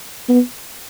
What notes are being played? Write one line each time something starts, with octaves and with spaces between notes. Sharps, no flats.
B3